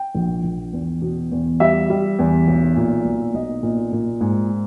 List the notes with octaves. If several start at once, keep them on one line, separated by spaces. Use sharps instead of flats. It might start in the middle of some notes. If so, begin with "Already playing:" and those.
Already playing: G5
A#1
A#1
E2
B2
E2
G3 E5
G3
E2
B1
A#2
B1
B1 D#5
A#2
A#2
G#2